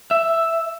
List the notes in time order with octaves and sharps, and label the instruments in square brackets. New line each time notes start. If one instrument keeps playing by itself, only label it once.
[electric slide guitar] E5